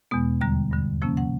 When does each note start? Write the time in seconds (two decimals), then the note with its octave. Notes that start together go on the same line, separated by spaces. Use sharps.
0.11 E2 B2 G#3 B3
0.41 D#2 D3 G3 A#5
0.71 G2 D3 G3
1.02 C3 F3 A#3 C#4 A5
1.17 F#5